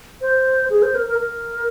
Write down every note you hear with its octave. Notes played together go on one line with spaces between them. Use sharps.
C5
G#4
C5
A#4
A#4
A#4